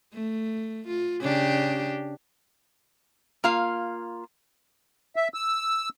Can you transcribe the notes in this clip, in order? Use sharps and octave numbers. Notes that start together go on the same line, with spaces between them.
A3
F4
C#3 D4 G4
A#3 F4 F5
E5
E6